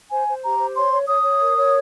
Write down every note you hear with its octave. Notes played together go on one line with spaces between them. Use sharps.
C5 G#5
C5
G4 A#5
C5
C#5 C6
C#5
C#5 D#6
C#5
A#4
C#5